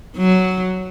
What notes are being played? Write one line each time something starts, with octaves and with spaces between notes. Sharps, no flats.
F#3